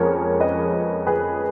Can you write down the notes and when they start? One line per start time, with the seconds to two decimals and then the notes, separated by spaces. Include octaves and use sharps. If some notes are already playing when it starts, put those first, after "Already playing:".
Already playing: F2 F3 G#3 C#4 A#4 C#5
0.40 B4 D#5
1.07 G#4 B4